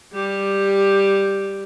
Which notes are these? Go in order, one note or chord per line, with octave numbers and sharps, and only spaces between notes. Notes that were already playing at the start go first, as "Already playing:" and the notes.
G3 G4